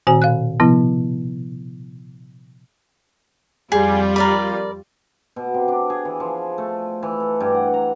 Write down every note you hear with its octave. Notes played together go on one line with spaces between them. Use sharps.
A#2 D#3 C4 F#4 C5 G#5
B2 F5 F#6
C3 F3 B3 E4
F2 G3 F4 G#4
A#4 D5 B5
B2
C3
D4
G#4
E3
F3
A3
E3
A4
G2
F#5
A#5